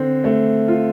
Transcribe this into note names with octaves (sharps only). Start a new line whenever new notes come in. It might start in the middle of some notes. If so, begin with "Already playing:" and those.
Already playing: D3 C4
A3
F4